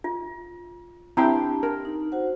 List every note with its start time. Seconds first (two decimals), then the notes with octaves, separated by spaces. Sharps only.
0.04 F4
1.17 C4 D4 E4 G4 G5 A5 A#5
1.63 A#4
1.85 D#4
2.12 F#4 C5 F#5